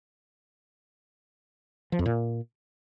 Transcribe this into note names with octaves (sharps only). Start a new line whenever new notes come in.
F3
F2
A#2